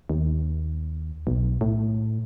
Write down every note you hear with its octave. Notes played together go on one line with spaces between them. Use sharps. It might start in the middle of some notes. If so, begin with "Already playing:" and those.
D#2
B1
A2